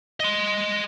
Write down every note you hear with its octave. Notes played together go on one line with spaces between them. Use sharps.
D#5 C6